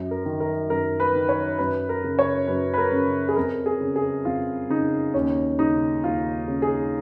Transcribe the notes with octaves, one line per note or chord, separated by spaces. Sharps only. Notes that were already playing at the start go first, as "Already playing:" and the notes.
Already playing: F#2
A#4
D#3
A#4
F#2 A#4
B4
D#3
C#5
F#2 B4
A#4
C#3
C#5
F#2 B4
B4
A#4
C#3
G#4
F2 A#4
G#4
C#3
G#4
F2 F4
C#3 D#4
D#2 C#4
C#3 D#4
D#2 F4
C#3
G#4